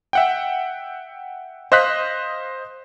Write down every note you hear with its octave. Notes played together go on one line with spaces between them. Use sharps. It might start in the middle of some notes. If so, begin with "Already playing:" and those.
E5 F#5 G5
C5 D#5 F5 D#6 F#6 B6